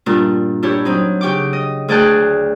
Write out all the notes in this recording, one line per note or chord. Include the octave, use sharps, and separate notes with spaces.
G2 A#2 D4
D4 E4 G4 C#5
F#3 C4 D#4
C#3 G4 G5 C#6 D6
D#5
D2 G#4 D5 G5 A5 F#6